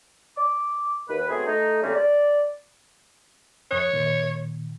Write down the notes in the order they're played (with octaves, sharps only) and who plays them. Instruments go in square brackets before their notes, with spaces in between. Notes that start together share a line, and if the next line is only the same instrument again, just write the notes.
[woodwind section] D6
D#2 B4
F#3 A3 B3 C4 G#4
A3 D#4
C#3 G3 A3 A#3 C4 C#4
D5
[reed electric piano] F2 D#6 F#6 [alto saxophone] C#5
[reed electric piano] A#2 D#3